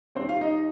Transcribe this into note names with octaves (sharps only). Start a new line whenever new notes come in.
D#2 D#3 G3 C4 C5
F4 F5
D#4 D#5